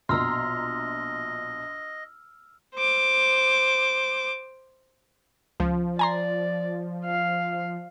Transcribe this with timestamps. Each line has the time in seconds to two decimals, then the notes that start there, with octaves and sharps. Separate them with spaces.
0.09 A#1 B2 D#5 A#5 C6 E6 F6
2.75 C5 D6
5.60 C#2 F3
5.99 D5 G#5 A#5 C6
7.06 F5